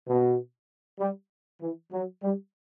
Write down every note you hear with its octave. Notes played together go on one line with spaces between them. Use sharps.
B2
G3
E3
F#3
G3